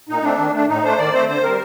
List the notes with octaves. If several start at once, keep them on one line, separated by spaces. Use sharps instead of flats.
A#2 D#4
A3 C4 D4
D#3
A3 D4
A2 D#4
A3 D4 C5
D#3 D5
A3 C4 C5
D3 C5
G3 C4 A#4